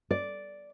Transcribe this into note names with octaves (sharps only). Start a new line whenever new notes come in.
D5